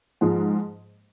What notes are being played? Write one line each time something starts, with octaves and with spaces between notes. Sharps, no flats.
G#2 F3 G#3